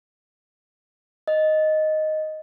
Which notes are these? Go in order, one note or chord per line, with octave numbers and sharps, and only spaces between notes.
D#5